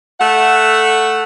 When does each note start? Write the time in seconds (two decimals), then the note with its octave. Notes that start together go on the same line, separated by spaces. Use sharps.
0.19 A3 F#5